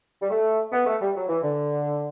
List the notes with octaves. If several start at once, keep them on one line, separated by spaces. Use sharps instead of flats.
G3
A3
B3
A3
G3
F#3
E3
D3